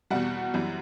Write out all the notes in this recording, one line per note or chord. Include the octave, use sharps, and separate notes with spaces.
E2 B2 G3 F#5
F#2 E3 G3